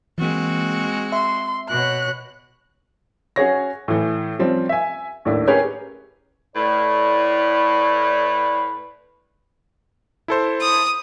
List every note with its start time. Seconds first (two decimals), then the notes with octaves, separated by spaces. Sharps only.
0.18 E3 G#3 A#3 C4 F#4
1.12 E5 C6
1.69 B2 C#5 F#6
3.36 C#4 F#4 G#4 C#5 A#6
3.88 A2 E3
4.39 F3 G3 C4 C#4
4.69 E5 G#5
5.25 D#2 A2 D4 E4
5.47 C#4 G4 G#4 A#4 B4 C#5
6.56 A2 B4 D5
10.28 E4 A4 C5
10.62 D#6